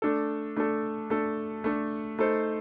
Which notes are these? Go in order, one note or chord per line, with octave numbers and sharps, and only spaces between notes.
A3 D4 A4
A3 D4 A4
A3 D4 A4
A3 D4 A4
A3 D#4 A4 C5